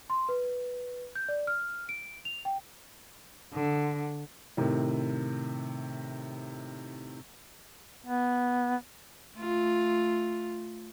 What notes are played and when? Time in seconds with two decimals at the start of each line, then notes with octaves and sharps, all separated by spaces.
0.10 C6
0.29 B4
1.15 G6
1.29 D5
1.47 F6
1.89 D7
2.25 F7
2.45 G5
3.53 D3
4.57 A2 C3 D#3
8.06 B3
9.37 A3 F4